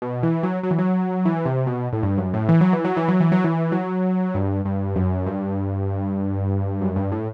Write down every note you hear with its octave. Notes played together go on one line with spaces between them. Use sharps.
B2
E3
F#3
F#3
E3
F#3
E3
C3
B2
A2
G2
F#2
A2
E3
F#3
E3
F#3
E3
F#3
E3
F#3
E3
F#3
G2
G2
F#2
G2
F#2
G2
A2